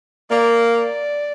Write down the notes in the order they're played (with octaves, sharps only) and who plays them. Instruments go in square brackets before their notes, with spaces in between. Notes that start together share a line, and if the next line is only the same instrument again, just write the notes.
[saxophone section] A#3 [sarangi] D5
[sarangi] D5